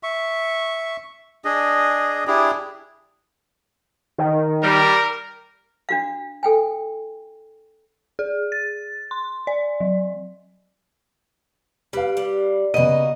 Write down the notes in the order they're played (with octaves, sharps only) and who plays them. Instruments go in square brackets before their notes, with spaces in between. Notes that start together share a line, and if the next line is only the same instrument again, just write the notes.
[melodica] E5 C#6
D4 G#4 D#5
D4 E4 G4 G#4
[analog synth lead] D#3
[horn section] G3 [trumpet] A#4
[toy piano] D4 F#4 F5
A4 G5 G#5
[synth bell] G#4
A6
C6
D5
F#3
[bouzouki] G3 [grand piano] B4 F5
[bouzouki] G3
[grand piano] C#3 B3 D#7 [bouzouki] A#3 F#4 [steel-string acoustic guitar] D#5